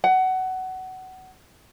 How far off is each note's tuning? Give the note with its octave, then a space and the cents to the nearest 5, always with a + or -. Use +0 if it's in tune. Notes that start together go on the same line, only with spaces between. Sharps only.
F#5 +20